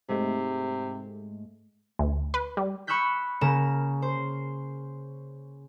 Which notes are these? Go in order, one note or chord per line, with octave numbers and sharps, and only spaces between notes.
G#2 C3 G#3 A3
D2
B4
G3
B5 C#6 E6 F#6 G6 B6
C#3 A#3 A#5 E7
C5